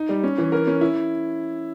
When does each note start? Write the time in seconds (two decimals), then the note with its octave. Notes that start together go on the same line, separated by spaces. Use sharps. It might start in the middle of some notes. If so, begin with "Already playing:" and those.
Already playing: D#4
0.09 G3
0.24 C#4
0.38 E3
0.52 A#4
0.67 C#4
0.81 E4